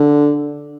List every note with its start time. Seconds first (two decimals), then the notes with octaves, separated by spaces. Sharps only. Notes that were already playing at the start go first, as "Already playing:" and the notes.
Already playing: D3